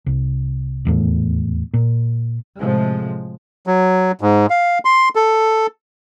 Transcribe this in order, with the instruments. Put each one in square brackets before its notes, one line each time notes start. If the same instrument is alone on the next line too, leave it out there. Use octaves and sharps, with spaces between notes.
[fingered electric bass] C2
D#1 E2 A2
A#2
[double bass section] A2 C3 F3 G#3
[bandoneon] F#3
G#2
F5
C6
A4